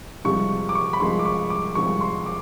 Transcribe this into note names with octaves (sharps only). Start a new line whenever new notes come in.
C2 C3 F3 G#3 C#6
D6
C#6
B5
C2 C3 F3 G#3 C6
D6
C#6
D6
C2 C3 F3 G#3 C#6
C6
D6